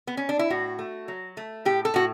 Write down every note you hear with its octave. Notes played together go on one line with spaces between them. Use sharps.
B3
C#4
D4
E4
A2 F#4
A3
F#3
A3
A2 G4
A4
A2 F#4